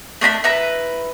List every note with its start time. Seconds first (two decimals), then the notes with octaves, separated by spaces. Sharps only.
0.21 A3 D4 A#5 B5
0.44 E4 B4 A#5